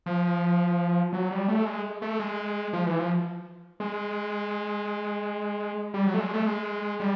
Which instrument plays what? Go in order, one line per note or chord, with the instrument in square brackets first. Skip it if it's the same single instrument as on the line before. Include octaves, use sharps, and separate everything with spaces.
[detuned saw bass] F3
F#3
G3
A3
G#3
A3
G#3
F3
E3
F3
G#3
G3
F#3
A3
G#3
A3
G#3
G3